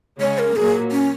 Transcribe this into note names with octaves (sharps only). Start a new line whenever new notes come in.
C#3 G#3 C#4 C#5
A#4
A#2 F#3 A#3 G#4
C#4